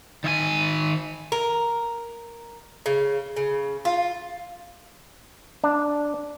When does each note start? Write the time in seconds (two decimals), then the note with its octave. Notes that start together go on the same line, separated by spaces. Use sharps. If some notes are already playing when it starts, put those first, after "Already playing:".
0.24 D#3 E5 G#5
1.32 A#4
2.86 C#3
3.37 C#3
3.85 F4
5.64 D4